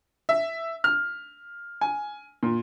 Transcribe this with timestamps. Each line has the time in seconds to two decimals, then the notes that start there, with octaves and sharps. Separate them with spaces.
0.29 E5
0.84 F6
1.81 G#5
2.43 A#2